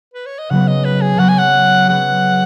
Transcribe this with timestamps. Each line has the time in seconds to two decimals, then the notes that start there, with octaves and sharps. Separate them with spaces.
0.14 B4
0.26 C#5
0.38 D#5
0.50 C#3 F#3 B3 F#5
0.67 D#5
0.85 B4
1.01 G#4
1.17 C#3 F#3 B3 F#5
1.29 G#5
1.39 F#5
1.88 F#3 B3 G#4 F#5